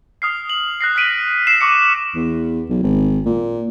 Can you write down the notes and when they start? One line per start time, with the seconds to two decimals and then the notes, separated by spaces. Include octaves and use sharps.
0.22 D#6 F6 C7
0.50 F#7
0.81 F#6 A#6 C7
0.96 F6 F#6 B6 D7 D#7 F#7
1.47 E6 C7 E7
1.61 C#6 D6 C#7
2.15 E2
2.70 B1
2.82 G#1
3.26 A#2